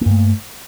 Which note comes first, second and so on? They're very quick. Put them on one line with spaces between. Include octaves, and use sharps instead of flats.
A#3 G2 A3